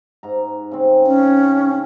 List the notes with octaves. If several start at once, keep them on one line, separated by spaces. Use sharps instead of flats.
G#2 A#5
C#3 C4
C#4